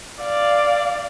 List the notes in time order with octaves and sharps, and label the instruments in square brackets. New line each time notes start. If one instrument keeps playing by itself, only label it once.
[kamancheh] D5 F5